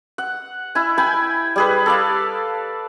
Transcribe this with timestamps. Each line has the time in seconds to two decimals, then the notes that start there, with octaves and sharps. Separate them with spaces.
0.18 F#5
0.75 E4 G#5
0.98 G5 G#5 B5
1.56 G3 G#4 B4
1.86 A4 D5 F5